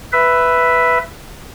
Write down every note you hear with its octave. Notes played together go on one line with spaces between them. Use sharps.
B4 E5